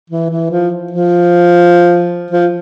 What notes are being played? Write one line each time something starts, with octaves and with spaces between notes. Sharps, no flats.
E3
E3
F3
F3
F3